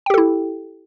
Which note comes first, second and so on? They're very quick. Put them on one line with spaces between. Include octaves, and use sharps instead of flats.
G5 G4 A4 E4